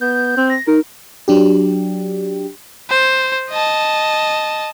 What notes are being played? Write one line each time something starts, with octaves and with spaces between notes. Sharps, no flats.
B3 G6
C4
A#6
D#4 A#4
F#3 D4 G4
C5
D#5 A5